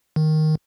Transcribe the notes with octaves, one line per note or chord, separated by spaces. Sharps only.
D#3